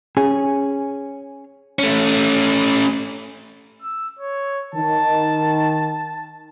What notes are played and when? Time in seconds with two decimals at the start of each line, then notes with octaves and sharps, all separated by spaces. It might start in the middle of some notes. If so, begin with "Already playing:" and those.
0.17 C#4 G#4
1.79 A3 C#4
3.82 E6
4.19 C#5
4.75 D#3 A5